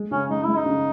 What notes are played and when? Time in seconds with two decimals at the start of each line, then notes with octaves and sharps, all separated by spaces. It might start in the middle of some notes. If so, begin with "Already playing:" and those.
Already playing: G#3
0.11 C#3 C#4
0.30 G#3 D#4
0.43 G#3 E4
0.57 D#4
0.66 C#3